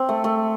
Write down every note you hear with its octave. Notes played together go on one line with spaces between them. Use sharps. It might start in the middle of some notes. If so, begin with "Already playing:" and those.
Already playing: C4
A3
A3